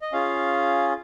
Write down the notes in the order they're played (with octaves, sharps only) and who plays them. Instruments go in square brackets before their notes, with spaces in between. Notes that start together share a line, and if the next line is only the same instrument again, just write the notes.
[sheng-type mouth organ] D#5
C#4 F4 G#4 F5